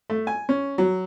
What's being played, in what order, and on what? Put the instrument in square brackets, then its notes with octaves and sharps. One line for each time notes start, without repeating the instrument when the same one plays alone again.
[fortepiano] A3
G#5
C#4
F#3